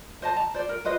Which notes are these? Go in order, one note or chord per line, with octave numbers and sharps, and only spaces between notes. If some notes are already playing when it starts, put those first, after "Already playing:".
C5 D#5 A5
A5 A#5
C5 D5
A#4
F4 B4 C5 D#5